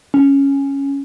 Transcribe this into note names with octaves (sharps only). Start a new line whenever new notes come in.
C#4